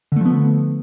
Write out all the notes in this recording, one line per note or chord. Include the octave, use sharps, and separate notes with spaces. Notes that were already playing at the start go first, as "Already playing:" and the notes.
D3 F3 A3 B3